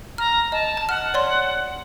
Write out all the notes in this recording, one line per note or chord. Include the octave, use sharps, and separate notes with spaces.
A#5 F6
D#5 A5
A5
F#5 F6
C#5 D5 C6